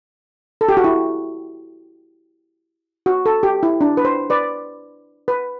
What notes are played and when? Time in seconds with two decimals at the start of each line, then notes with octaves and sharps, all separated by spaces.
0.61 A4
0.69 G4
0.77 F#4
0.84 E4
3.06 F#4
3.26 A4
3.43 G4
3.63 E4
3.81 D4
3.97 B4
4.05 C5
4.30 B4 D5
5.28 B4